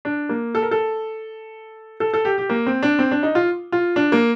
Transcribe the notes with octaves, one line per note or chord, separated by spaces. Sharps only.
D4
A#3
A4
A#4
A4
A4
A4
G4
G4
A#3
C4
D4
C4
D4
D#4
F4
F4
D4
A#3